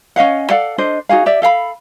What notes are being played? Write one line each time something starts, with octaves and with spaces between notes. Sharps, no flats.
C#4 D#5 F5 F#5
A4 D5 F5 F#5
D4 A4 C5 D#5
D#4 F#4 G#4 F5
G4 D5 E5
A4 F5 F#5 B5